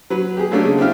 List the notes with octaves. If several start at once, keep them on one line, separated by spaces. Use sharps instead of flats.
F#3 B4
G4 G#4
F#3 A3 A#3 C#4 D4 G4
C#3 G#3
C4 D4 E4 G4 F5